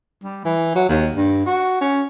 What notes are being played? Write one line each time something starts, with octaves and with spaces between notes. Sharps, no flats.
G3
E3
F#3
D#2
G2
F#4
C#4